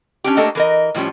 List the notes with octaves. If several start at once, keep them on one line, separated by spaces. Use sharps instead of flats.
C#4 D4 G4
A3 A#3 D4 G4 A4 D#5
E3 A#4 D#5
A2 F3 G3 C#4